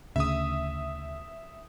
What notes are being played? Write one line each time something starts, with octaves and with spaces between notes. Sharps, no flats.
D2 C#3 E5 D#6